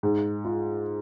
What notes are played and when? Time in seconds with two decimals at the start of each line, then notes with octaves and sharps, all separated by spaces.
0.03 G#2
0.45 F4